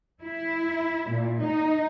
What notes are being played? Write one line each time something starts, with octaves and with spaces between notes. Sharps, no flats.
E4
A#2
D#4